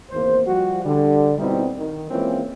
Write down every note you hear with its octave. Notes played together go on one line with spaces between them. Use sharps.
G#1 E2 A#3 C5
F3 G3 F#4
D3 G3
B2 G3 C4 D#4 E4
D#3
E3 G#3 A#3 C4 C#4 F4